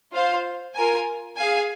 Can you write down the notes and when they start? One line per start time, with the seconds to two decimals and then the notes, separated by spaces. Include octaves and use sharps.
0.12 F4 C5 F5
0.75 F4 A#4 G#5
1.37 G#4 F5 G#5